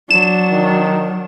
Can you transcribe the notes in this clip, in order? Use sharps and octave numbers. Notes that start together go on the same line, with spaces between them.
F#3 D4 E7
D#3